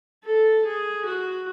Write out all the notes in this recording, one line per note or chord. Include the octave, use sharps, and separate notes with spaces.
A4
G#4
F#4